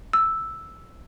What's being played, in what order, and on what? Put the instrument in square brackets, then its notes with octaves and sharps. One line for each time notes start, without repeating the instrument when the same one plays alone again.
[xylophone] E6